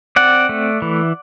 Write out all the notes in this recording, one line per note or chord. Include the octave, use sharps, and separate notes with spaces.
C4 D5 F#5
A3
E3